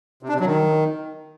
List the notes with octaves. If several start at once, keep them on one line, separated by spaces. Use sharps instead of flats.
C3
D4
C3
F#3
D#3